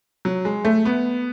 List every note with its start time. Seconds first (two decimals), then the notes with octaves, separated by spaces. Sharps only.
0.25 F#3
0.45 G#3
0.65 A3
0.85 B3